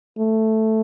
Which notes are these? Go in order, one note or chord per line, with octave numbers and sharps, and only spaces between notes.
A3